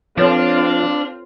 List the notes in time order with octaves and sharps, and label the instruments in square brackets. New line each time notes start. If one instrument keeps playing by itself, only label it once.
[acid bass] F3 [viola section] C4 F4 F5 [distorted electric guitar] D4 [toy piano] A4 B4 C#5